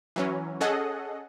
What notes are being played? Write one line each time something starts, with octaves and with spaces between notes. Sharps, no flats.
E3 F#3 C#4
C#4 G#4 A4 D#5 F#5